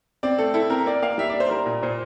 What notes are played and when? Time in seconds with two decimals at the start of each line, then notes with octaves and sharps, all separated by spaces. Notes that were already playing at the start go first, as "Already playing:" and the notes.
0.23 C4 D5
0.38 A3 A4
0.54 E4 A4
0.70 C4 A#4
0.86 A#3 D5
1.02 A#3 F5
1.18 G3 E5
1.30 D4 D5
1.40 C5
1.50 G3 A#4
1.66 A#2
1.83 A#2 C5